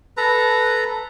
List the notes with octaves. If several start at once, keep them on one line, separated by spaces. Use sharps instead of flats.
A4 B4 A#5